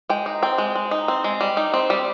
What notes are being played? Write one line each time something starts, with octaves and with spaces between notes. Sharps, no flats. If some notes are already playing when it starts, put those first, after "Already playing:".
G#3 G5
D#4
C4 G5
G#3
G#3
D#4
C4
G#3
G3
D#4
C4
G3